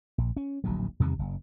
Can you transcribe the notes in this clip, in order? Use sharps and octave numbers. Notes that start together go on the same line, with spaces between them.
A#1
C#4
D1 A#1 D#2 F#3
E2 C3 D#3 G3
F#1